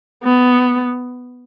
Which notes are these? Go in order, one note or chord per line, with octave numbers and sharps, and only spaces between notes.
B3